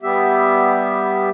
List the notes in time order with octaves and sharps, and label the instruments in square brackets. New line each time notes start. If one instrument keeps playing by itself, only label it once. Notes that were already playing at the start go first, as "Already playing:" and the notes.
[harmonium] G3 B3 G4 E5